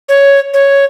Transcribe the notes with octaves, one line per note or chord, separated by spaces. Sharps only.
C#5
C#5